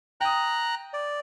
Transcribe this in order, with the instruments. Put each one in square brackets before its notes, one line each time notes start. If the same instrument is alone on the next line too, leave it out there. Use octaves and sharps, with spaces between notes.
[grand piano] G5 D#6 [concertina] A#5 F#6
[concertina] D5